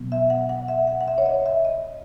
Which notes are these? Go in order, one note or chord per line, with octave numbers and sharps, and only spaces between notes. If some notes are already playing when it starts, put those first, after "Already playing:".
Already playing: B2 F#3 B3
E5
F#5
F#5
E5
F#5
F#5
E5
C#5
D#5
E5
D#5